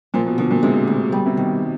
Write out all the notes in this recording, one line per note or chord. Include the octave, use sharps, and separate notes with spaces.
A#2 F3
B2
B2 D3
A#2
C3 G#3
D2
B2 G3
C3
B2 D#3